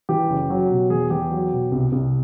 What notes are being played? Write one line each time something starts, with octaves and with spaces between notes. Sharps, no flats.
E3 G4
F#1
F#3
B2
E2 G#4
E2 G4
F#3
B2
C2
C2